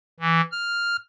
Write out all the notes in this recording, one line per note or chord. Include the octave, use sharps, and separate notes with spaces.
E3
F6